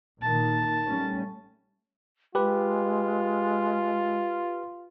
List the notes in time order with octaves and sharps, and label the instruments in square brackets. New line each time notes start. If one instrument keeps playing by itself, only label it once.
[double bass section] A#2 D#3 A#3 [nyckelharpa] A5
[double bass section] G3 A3 C#4
[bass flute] G#3 [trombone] F4 [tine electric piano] G4 B4